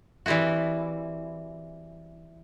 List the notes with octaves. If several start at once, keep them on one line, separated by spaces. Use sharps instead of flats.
E3 G3 C4 E4 F#4